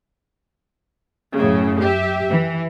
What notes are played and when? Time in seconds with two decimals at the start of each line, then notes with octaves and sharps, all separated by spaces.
1.36 F#2 A2 C#3
1.82 G4 E5
2.30 E3